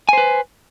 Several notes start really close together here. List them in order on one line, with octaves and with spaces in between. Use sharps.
G#5 C5 B4